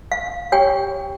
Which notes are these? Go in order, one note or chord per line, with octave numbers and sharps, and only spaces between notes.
F5
G4 C#5 G5